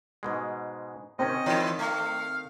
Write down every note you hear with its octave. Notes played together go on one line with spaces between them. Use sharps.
G#2 B2 G#3
C3 D#3 C4 C#4 D#5
D#3 E3 D#4 E4
A3 F5